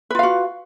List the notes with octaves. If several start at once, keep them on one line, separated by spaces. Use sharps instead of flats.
F4 F#4 B4 F5